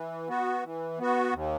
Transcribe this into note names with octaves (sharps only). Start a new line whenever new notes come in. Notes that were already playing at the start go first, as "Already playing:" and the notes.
Already playing: E3
B3 F#4
E3
B3 F#4
D#2